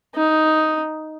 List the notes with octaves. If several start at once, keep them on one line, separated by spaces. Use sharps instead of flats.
D#4